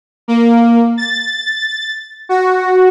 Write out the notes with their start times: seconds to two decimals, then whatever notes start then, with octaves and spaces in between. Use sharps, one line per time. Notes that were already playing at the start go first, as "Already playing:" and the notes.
0.28 A#3
0.97 A6
2.29 F#4